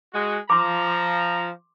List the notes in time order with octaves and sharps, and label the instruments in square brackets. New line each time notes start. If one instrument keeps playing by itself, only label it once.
[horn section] G#3 F#4
[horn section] F3 A#5 [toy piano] C6 D6